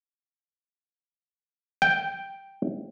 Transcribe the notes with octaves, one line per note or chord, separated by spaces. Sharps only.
G5